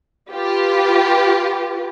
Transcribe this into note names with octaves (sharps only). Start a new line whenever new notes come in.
F4 G4 B4